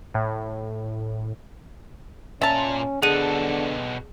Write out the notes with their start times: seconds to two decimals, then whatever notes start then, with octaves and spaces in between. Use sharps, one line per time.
0.14 A2
2.41 A#2 C#4 E5 A5 A#5
3.02 B2 D3 G#4 A4 F#5 D#7